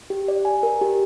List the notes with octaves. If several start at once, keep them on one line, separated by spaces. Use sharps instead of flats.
G4
D5
G#5
A#4
G4